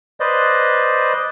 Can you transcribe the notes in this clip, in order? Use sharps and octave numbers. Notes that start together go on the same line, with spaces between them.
B4 C5 D5 D#5